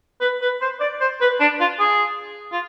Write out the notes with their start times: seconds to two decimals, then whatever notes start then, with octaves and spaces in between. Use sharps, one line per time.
0.21 B4
0.42 B4
0.61 C5
0.80 D5
1.01 C5
1.21 B4
1.40 D4
1.60 F4
1.80 G#4
2.52 F4